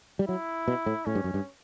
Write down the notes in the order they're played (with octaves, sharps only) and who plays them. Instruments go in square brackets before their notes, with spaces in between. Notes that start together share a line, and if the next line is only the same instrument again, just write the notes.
[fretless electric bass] G3
[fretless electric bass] F#3 [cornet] E4
[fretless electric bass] B2
A2
[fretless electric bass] A2 [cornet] C#4
[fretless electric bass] G2
F#2
G2